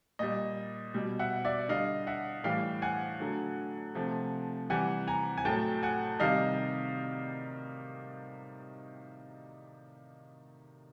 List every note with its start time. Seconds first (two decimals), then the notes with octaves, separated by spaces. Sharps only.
0.19 A#2 G3 D#5
0.94 B2 G3
1.19 E5 F#5
1.45 D5 E5
1.69 D3 G3 D#5 F5
2.07 E5 F#5
2.44 A2 E3 G3 F5 G5
2.82 F#5 G#5
3.20 D3 F#3 A3
3.95 C3 F3 A3
4.70 C3 E3 G3 F#5 G#5
5.07 G#5 A#5
5.38 G#5
5.45 A2 F#3 A3 G5 A5
5.83 F#5 G#5
6.20 C3 D#3 G3 D#5 F5